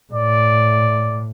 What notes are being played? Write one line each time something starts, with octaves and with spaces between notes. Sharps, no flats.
A2 D5